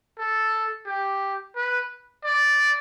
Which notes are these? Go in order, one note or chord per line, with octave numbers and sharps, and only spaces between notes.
A4
G4
B4
D5